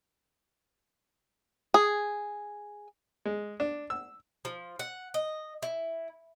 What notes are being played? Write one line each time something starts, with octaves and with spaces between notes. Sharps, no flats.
G#4
G#3
D4
E6
F3
F#5
D#5
E4